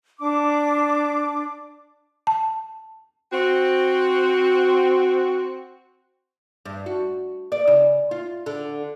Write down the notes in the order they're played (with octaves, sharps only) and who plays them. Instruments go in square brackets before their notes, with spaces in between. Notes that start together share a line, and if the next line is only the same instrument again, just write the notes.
[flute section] D4 D6
[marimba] A5
[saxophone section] C4 F#4
[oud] G2
F#4
D5
C#3
F4
D3